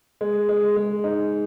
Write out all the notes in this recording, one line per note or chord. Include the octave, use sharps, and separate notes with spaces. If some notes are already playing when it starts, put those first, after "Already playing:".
G#3
G#3
G#3
D#4